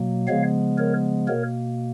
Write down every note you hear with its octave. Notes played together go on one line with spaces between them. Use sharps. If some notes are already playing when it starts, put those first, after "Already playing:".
Already playing: B2 F#3 A#3
C#3 F3 G#3 B3 C#5 F5
A#4 C#5
B2 A#3 A#4 C#5